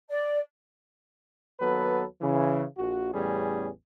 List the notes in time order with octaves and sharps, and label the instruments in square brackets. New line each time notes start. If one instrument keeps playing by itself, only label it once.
[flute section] D5
[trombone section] D#2 F#3 B3 A4 B4
C#3 E3
A#1 F#4
A1 E2 A2 G3 C#4 G#4